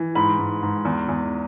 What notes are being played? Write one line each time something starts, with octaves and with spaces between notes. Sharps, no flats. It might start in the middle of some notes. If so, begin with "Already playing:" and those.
Already playing: E3
G#2 B5
G#2
G#2
E2
E2